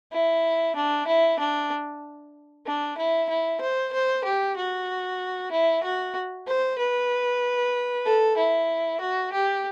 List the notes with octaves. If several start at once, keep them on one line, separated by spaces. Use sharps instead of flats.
E4
D4
E4
D4
D4
E4
E4
C5
C5
G4
F#4
E4
F#4
C5
B4
A4
E4
F#4
G4